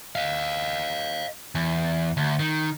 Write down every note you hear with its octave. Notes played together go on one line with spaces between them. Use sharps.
D#5 F5
E2
D2
D#3